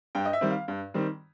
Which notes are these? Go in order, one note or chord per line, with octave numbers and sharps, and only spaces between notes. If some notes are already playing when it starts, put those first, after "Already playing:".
G2 G5
D#5
E5
D#3 G3 C4
F5
G2
D#3 G3 C4